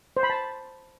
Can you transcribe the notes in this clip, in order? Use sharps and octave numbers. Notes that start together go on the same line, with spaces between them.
C5
B5
A5